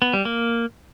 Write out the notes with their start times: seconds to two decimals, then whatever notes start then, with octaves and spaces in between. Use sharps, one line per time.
0.02 B3
0.13 G3
0.25 A#3